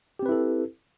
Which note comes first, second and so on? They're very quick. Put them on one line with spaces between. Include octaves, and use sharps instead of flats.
G4 C4 B4 E4 A4